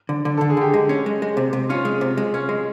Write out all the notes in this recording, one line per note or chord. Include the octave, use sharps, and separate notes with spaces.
D3
D3
A4
D3
G#4
D3 G4
G#3 G4
C#4
G#3
G#3
C3
C3
C#4 F4
G#3
C3
G#3
C#4
G#3